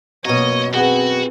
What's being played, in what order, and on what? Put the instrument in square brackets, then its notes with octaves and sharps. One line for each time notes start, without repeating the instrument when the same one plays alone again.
[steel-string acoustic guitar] F#2 B2 [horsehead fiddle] A#3 C#5 [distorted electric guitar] D#5
[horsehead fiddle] C4 G#4 [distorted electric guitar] F#4 [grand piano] B4 F#5 G7